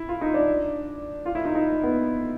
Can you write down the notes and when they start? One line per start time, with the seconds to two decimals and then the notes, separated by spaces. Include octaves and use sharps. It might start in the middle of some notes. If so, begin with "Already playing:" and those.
Already playing: E4
0.09 F4
0.21 D#4
0.34 D4
1.25 F4
1.35 E4
1.45 D#4
1.55 D#4
1.84 B3